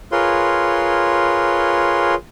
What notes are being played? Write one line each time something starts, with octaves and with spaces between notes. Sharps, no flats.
F4 G#4 A#4 B4 C#5 C6